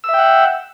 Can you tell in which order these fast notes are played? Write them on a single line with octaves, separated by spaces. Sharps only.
E6 E5 G5 F#5